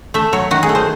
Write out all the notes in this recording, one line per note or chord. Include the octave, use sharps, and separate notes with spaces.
A3 E5
F#3 C#5
D#3 F#4
G#4
A3
C5